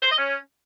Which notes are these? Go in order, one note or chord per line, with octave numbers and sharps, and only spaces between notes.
C5
D#5
C#4